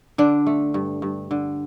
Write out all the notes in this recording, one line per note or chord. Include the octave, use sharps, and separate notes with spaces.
D3 D4
A3
G2
G2
D3